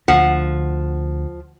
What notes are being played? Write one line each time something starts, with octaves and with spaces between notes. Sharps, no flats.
D2 D3 F3 F#5